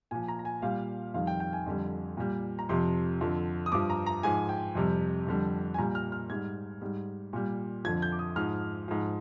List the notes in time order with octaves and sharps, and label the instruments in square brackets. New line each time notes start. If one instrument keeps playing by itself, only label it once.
[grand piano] A#2 F3 G#5
A#5
A#5
G#5
A#2 G3 F5
F2 D#3 G3 F5
G5
G5
G#5
F2 D3 G3
A#2 G3
A#5
F2 C3 F3 C6
F2 D3 F3
D#6
G2 F3 D6
A#5
A#5
G#2 F3 G#5
G5
F2 C3 G3
F2 D3 G3
G#5
A#2 G3 A#5
F6
F6
G#2 G3 G#6
G#2 G3
A#2 G3
F2 D3 F3 G#6
G6
D6
D#6
G#2 F3 F6
G#2 F3